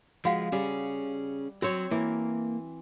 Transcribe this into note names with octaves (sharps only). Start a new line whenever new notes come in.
F3 G#3 F#4 F5 F#5
G3 C#4 G#4
F#3 C4 F#4 C#5
E3 A#3